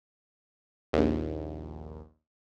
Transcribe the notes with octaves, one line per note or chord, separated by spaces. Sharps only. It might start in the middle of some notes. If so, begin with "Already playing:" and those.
A#1 D#2